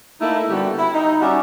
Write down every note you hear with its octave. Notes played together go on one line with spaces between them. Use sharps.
A3 A#3 D#4 E4
D3 G3 B3 F#4 G4
E4
D#4
G3 C#4 F#4 G4 D5 E5